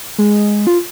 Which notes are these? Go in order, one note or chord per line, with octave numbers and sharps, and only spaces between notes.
G#3
F4